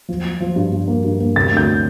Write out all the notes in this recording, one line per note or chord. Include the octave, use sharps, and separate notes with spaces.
F3
F3
F3
G2
G2
A#3
G2
A#3
C3 A6
D2
G6